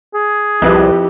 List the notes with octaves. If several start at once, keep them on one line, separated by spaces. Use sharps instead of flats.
G#4
C2 F2 E4 G4 B4 E5